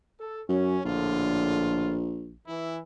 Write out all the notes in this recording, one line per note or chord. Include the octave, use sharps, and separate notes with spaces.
A4
F#2 C#4
A#1 A2 D3 F4
E3 E4